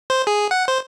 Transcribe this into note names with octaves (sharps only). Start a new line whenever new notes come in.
C5
G#4
F#5
C5